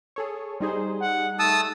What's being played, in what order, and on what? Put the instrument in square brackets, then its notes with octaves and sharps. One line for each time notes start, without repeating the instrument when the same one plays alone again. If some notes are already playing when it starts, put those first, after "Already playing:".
[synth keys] G#4 A4 C#5
[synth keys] G3 D#4 G#4 [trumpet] C5
[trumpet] F#5
[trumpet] A3 [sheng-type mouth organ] A5 D#6 E6